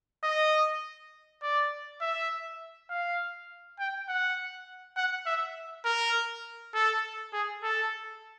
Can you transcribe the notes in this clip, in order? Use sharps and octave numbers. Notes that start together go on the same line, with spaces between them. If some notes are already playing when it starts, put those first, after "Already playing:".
D#5
D5
E5
F5
G5
F#5
F#5
E5
A#4
A4
G#4
A4